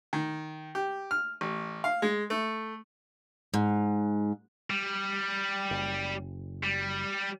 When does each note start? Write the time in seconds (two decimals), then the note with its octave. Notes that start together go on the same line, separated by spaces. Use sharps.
0.13 D#3
0.75 G4
1.11 F6
1.41 A1
1.84 F5
2.02 G#3
2.30 A3
3.54 G#2
4.70 G3
5.71 F#1
6.64 G3